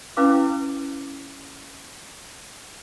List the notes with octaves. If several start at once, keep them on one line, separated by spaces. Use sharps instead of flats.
C#4 E4 B4 F5 D6